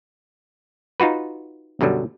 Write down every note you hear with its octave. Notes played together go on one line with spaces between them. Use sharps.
D#4 F4 F#4 B4
F#2 B2 D3 F#3 G3